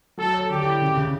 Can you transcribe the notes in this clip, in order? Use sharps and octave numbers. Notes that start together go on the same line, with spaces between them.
F#3 A4
C#5
D3 G4
E4
C#3
C#3